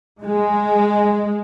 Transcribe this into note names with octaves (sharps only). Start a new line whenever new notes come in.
G#3